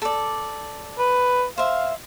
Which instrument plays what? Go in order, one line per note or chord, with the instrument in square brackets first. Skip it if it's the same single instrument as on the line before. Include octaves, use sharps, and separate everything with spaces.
[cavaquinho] A4 D5
[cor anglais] B4
[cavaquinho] C5 E5 [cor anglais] F5